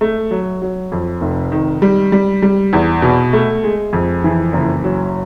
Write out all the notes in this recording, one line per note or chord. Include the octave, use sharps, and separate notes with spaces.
A3
F#3
F#3
F2
F1
D#3
G3
G3
G3
E2
B2
A3
G#3
F2
E3
F#1
F#3